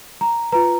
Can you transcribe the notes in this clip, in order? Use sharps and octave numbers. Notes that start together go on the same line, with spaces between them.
A#5
F4 B4 A#5